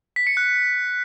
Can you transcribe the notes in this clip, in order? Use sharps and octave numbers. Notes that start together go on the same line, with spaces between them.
B6
C#7
F#6